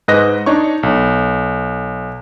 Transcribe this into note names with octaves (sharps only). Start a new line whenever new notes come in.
G#2 B4 D#5 F#6 A#6
D4 D#4 C#5 C#6
B1